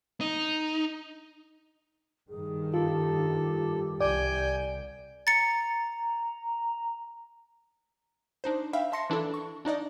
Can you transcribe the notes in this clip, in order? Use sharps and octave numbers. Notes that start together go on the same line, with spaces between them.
D#4
G2 D#3 G#4
F4 G4 A4
C2 D5 G5 G#5 G6
A#5 A6 C#7
D4 D#4 C5
E5 F5 G5 B5
E5 A5 C6 A#6 C#7
E3 D4 E4 A4
C#6
D4 D#4 D5 D#5